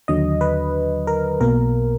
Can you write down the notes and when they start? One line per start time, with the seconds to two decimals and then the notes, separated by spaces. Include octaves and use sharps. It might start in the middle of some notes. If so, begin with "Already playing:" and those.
0.08 D#2 D3 F#3 D#5
0.41 B4
1.07 A#4
1.40 B1 B2 A#3 A#4